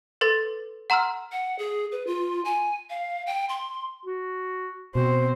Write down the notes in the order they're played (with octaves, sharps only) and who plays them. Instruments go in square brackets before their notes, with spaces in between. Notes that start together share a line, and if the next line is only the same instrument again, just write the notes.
[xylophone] A4 B4 C6 A6
F#5 A#5 C6 E6 F6
[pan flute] F#5
G#4
B4
F4
G#5
F5
G5
C6
[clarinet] F#4
[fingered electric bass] B2 [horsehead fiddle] C4 C5 [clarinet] F#4